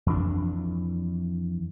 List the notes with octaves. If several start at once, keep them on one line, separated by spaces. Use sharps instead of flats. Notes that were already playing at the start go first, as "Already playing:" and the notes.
F2 E3 D4